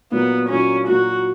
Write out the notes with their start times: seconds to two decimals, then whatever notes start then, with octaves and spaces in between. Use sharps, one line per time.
0.11 A#2 F#3 A#3 B3
0.49 A#2 F#3 A#3 C#4
0.88 A#2 F#3 A#3 F#4